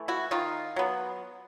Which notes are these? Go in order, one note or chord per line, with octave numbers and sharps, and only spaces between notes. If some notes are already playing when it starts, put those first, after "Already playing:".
Already playing: E3 A3
E4 F#4
D#3 D#4 F4
F#3 B3